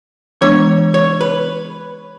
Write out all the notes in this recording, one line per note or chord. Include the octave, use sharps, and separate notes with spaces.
E3 G#3 B3 D4 C#5
C#5
B4